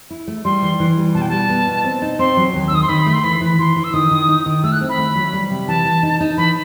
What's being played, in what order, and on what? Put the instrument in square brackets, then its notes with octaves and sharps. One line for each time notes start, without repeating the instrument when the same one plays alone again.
[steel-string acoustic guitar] E4
A3
[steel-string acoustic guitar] G3 [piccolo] C6
[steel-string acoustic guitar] E3
E3
G3
[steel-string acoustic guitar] B2 [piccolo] A5
[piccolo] G5
[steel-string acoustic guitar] G3 [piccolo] A5
[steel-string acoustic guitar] B3
B2
C4
D#4
[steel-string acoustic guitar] C4 [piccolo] C6
[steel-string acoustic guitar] F#3
D#2
[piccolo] E6
[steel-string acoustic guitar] D#3 [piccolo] D#6
[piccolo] C6
[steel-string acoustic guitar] D#3 [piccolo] B5
[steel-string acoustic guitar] A3
[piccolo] C6
[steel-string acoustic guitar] E3 [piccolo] B5
[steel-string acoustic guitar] E3
[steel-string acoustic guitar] E3 [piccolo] C6
[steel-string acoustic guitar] E3
[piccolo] E6
[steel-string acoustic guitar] D#3 [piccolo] D#6
[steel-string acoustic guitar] D#3
D#4
D#3
[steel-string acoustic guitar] A3 [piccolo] E6
[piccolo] F#6
[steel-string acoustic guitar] C4
[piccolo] B5
[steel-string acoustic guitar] A3
F#3
G3
C3
[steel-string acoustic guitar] E3 [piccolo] A5
[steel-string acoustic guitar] E3
D#4
D#4
[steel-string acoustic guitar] E3 [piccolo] B5